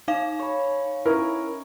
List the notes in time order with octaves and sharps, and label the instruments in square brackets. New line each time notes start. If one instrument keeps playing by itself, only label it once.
[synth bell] D#4 F5
[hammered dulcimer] C#5 B5
[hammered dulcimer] C#4 D#4 C#5 [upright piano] E4 A#4